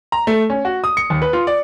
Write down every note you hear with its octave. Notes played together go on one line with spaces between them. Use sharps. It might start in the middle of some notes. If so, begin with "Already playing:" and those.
A#5
A3
C#4
F#4
D#6
C#7
D#2
B4
F4
D5